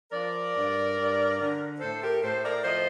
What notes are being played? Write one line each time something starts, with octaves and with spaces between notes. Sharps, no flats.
F3 A#4 D5
G2
G2
D3
A2 A4 C5
G4 A#4
A2 A4 C5
A#4 D5
F3 C5 D#5